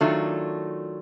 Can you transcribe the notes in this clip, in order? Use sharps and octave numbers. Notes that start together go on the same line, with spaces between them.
D#3 F#3 A3 D4 F4